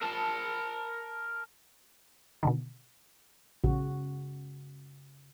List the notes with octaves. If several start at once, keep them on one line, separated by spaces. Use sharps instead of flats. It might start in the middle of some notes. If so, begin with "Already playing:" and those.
A#4 A5
B2 D3 D#3
A#1 C#3 F#4